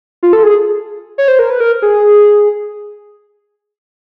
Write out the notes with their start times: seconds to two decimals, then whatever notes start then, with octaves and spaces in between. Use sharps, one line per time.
0.23 F4
0.33 A4
0.43 G#4
1.18 C#5
1.28 C5
1.39 A#4
1.50 B4
1.60 A#4
1.82 G#4